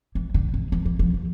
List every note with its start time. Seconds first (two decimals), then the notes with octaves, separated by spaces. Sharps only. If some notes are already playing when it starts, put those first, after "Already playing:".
0.15 E3
0.34 D3
0.54 E3
0.72 E3
0.85 E3
0.99 F3
1.14 F3